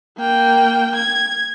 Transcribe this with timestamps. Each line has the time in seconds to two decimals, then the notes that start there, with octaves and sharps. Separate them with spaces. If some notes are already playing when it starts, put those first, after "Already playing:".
0.18 A#3 G5
0.96 G#6